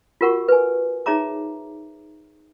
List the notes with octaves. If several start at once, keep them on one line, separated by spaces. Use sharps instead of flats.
F4 F#4 A#4 F#5 C#6
B4 G#5
D#4 G#4 C#5 E5 A#5 D6